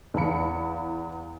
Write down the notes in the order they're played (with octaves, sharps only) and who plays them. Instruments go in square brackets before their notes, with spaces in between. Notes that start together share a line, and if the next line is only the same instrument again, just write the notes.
[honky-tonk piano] E2 E3 F5 B5 C#7